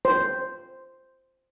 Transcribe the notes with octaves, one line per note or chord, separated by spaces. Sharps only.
C5